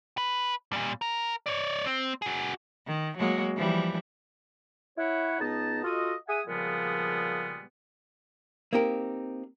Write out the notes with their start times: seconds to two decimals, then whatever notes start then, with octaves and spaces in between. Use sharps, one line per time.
0.18 B4
0.73 A#2 G3
1.02 A#4
1.46 C#5 D5
1.86 C4
2.22 F#4 G#4
2.87 D#3
3.17 F#3 G#3 A#3
3.57 E3 F3 G3
4.98 E4 C#5 F#5
5.40 C#2 B3 D#4 D#5 A5
5.84 F4 F#4 A4 D#5
6.29 G#4 E5 F#5 G#5 D#6
6.47 A#2 C#3 F3 G3 G#3 B3
8.73 A#3 C4 D#4 G4 A#4